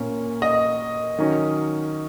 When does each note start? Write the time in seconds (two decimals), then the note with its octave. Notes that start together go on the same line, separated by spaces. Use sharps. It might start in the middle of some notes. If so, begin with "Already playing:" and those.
Already playing: A#2 A#3 C#4
0.42 D#5
1.19 D#3 F#3 C#4